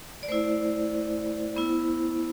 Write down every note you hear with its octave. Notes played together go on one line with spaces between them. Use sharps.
D5
A3 E4 C5
B3 E4